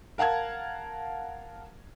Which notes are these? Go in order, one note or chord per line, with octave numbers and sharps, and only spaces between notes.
A#4 F5 F#5 A5 G#6